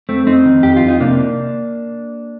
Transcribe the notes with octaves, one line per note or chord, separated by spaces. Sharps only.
F2 A3 C4
F2 C4 D#4
D#3
F2 G4
F4
F2
D#4
C3 A#3 D4